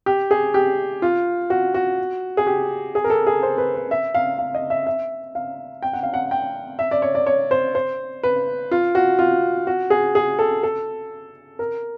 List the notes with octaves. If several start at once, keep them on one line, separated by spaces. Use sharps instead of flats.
G4
G#4
G4
F4
F#4
F#4
G#4
G4
G#4
A#4
A4
G#4
C5
B4
B4
E5
F5
F5
D#5
E5
E5
F5
G5
F#5
F5
F#5
G5
E5
D5
C#5
D5
C#5
C5
C5
B4
F4
F#4
F4
F#4
G#4
G#4
A4
A4
A#4